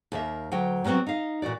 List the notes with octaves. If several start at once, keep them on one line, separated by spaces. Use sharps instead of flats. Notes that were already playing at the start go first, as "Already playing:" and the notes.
D#2 A#3 E5
D2 F#3 G5
F#3 G3 B3 C4 F#4
D#4 F5
A#2 E3 F#4 D5